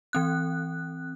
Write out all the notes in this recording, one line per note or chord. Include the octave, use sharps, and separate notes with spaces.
E3 C4 F#6